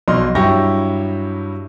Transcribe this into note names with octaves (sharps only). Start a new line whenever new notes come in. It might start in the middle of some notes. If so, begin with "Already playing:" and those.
B1 B2 D#5 C6 F6
G2 F#3 E4 G4 C#6 A#6